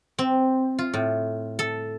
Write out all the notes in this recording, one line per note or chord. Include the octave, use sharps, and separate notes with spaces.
C4
F4
A2
A4